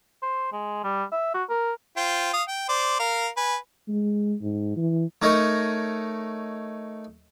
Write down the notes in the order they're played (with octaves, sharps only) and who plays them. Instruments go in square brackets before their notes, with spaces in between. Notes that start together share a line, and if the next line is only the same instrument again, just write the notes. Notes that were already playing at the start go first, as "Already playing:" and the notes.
[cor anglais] C5
G#3
G3
E5
F#4
A#4
[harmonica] F4 C5 G5
F5 D#6
G5
C5 D5
A#4 F5
B4 G#5
[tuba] G#3
G#2
E3
[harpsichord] A3 D#4 A#4 C#5 D#5